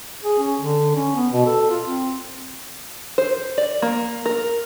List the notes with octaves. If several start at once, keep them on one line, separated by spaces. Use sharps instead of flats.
G#4
C#4
D3
C#4
B3
B2
A4
F4
C4
C5
D5
A#3
A#4